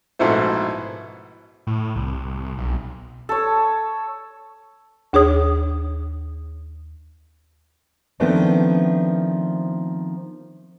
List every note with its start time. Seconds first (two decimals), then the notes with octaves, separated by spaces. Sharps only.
0.19 A#1 G#2 B2 A3 E4 C5
1.67 A2
1.96 C2
2.57 B1
3.29 A4 C#5
5.13 D#2 D4 G#4 C#5 D#6
8.20 D#3 F3 A3 B3 C4 D4